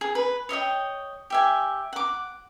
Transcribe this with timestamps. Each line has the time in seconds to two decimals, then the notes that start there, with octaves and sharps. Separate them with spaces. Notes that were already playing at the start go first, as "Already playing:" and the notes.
0.01 G#4
0.15 B4
0.49 C#5 D#5 E5 G5
1.30 G4 E5 G#5
1.93 F#5 D6